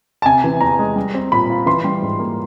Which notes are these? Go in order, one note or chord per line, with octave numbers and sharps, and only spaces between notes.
A5
C3 G#5
E3
E2 A#5
G#3
G3
C4
A#2 B5
F4
E3 C6
G3
G#2
A#3